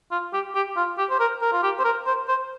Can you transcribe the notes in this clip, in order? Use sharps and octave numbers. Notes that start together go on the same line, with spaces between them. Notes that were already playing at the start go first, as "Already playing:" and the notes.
F4
G4
G4
F4
G4
C5
A#4
A#4
F4
G4
C5
A#4
C5
C5